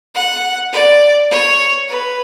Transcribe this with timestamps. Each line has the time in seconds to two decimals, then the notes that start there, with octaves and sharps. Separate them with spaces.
0.15 F#5
0.72 D5
1.30 C#5
1.89 B4